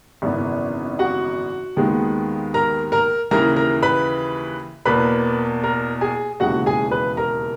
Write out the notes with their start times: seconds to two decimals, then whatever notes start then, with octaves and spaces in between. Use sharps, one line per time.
0.22 G#1 F#2 C#3 E3 B3
0.99 F#4 F#5
1.76 D#2 D#3 G#3 B3
2.54 A#4 A#5
2.92 A#4 A#5
3.31 D#2 C#3 E3 A#4 A#5
3.56 A#4 A#5
3.82 B4 B5
4.85 E2 B2 A#3 B4 B5
5.63 A#4 A#5
6.01 G#4 G#5
6.40 E1 D#2 C#3 E3 G#3 F#4 F#5
6.66 G#4 G#5
6.91 B4 B5
7.17 A#4 A#5